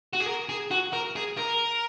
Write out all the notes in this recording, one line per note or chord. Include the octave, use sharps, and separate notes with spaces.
F#4
G#4
A#4
G#4
F#4
A#4
G#4
A#4